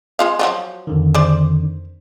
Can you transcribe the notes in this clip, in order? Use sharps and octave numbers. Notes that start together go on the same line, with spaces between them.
G#3 F4 F5
F3 F#3 F4
F2 D3 D#3
C5 D5